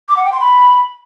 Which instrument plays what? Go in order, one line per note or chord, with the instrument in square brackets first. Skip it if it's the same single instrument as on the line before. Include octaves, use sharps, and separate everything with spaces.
[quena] D6
F#5
G5
C6
B5